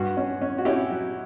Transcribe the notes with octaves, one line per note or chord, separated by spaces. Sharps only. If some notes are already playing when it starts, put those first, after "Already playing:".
Already playing: G2 F#4
C#4
C#4
F#4
C#4 E4 G4
F#3